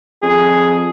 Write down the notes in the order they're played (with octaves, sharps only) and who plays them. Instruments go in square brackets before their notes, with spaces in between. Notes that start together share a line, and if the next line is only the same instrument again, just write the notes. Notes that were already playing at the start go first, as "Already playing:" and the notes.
[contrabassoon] F2 [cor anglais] G#4